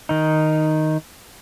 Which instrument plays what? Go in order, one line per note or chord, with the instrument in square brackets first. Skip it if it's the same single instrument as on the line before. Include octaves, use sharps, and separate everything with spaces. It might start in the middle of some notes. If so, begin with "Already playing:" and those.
[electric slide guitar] D#3 D#4